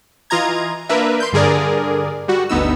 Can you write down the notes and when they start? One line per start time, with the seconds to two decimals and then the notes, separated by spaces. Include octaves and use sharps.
0.30 E3 F4 D#5 A#5 G#6
0.89 A#3 D4 A#4 B4 E5
1.20 C6 G6
1.33 G2 D3 G#4 A#4 D5
2.28 G3 F#4
2.49 G1 D2 B3 D#4 E6